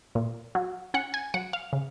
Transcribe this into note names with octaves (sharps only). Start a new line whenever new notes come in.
A#2
F#3
C#4 F#5
G#5
F#3 F#5
F5
C#3